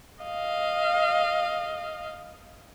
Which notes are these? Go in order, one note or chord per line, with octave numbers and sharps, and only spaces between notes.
D#5 F5